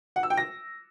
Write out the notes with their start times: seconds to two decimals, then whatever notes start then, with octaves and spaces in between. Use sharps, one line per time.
0.16 F#5
0.23 E6
0.30 G5
0.37 A#6